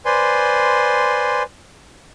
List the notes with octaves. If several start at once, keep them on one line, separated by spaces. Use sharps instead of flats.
B4 C5 D5 G#5 C6